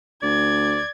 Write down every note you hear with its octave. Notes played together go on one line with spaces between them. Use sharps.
D2 D5 G#6